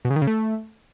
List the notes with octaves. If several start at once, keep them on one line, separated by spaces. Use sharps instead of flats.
B2
C#3
D#3
C#3
A3